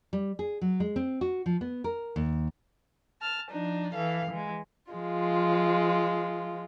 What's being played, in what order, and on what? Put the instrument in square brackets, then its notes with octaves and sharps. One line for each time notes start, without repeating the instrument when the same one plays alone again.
[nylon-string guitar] G3
G#4
F#3
G#3
C4
F#4
F3
B3
A#4
D#2
[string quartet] A5 F6
F3 D4 D#4
E3 A4 F5
E3 G#3
F3 G#3 F4